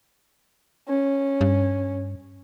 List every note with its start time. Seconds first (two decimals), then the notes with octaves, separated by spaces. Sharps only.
0.89 C#4
1.41 G2